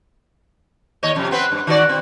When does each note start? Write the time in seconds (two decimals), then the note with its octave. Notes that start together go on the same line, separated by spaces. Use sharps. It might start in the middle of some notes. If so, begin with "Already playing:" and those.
1.03 D#2 C#5 D#5
1.15 F2 C3 C#4
1.31 B3 C4 B4
1.52 G2
1.67 D#3 F#4 D5
1.85 B2 C4